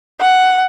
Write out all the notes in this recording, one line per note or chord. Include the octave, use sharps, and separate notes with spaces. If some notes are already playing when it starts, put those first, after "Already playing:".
F#5